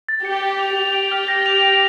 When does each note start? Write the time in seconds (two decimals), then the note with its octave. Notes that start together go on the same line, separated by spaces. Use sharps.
0.09 A6
0.25 G4 C#7
0.43 A6
0.59 F7
0.77 G4 F7
0.94 D7
1.12 F6
1.28 A#6
1.46 F7
1.63 D7